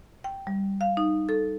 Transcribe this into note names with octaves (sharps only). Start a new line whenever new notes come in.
G5
G3
F5
D#4
A4